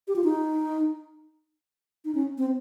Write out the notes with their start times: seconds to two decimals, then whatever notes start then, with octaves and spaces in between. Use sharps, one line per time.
0.08 G4
0.16 F4
0.24 D#4
2.05 D#4
2.15 C#4
2.38 C4